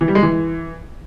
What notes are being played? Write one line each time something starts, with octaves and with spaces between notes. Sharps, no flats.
E3
G3
G#3
E3